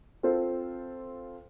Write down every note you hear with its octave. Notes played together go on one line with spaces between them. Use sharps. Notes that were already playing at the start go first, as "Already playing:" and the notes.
C4 F4 A4 C5